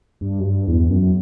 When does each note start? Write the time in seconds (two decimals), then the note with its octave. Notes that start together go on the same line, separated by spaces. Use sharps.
0.21 G2
0.39 F#2
0.44 G2
0.67 E2
0.90 F#2